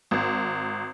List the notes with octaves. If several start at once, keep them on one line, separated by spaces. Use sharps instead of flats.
G#1